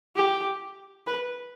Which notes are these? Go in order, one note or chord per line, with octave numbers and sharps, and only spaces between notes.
G4
B4